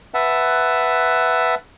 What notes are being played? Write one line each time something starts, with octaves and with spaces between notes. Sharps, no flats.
B4 E5 F#5 A5